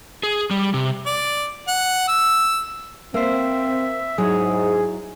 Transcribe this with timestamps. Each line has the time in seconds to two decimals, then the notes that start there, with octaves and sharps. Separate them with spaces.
0.23 G#4
0.51 G3
0.74 C3
1.06 D5
1.68 F#5
2.08 E6
3.14 A#3 C4 C5 E5
4.18 G#2 F#3 E4 G#4 C#5